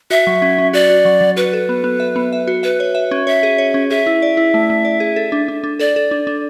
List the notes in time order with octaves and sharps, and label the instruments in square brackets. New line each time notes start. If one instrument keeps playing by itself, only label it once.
[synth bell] F#4 [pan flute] E5
[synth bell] F#3
C#4
C#4
[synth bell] F#4 [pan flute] D5
[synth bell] F#4
F#3
F#3
[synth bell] F#4 [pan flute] B4
[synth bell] A4
B3
B3
E5
B3
E5
F#4
[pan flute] B4 [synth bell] E5
[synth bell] C#5
E5
C#4
[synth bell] C#5 [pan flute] E5
[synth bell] G#4
C#5
C#4
[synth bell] G#4 [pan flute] E5
[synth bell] E4
D5
E4
A3
A3
D5
G#4
A4
D4
D4
D4
[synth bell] A4 [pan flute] D5
[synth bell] A4
D4
D4